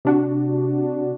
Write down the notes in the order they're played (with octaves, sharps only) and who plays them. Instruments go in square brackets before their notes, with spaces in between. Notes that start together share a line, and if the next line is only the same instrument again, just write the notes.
[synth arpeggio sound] C3 D4 F#4